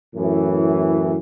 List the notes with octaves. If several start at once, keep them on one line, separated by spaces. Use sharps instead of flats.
F#2 A2 E3